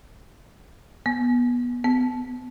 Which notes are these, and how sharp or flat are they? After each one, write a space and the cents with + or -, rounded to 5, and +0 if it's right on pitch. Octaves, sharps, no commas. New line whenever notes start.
B3 -20
B3 +30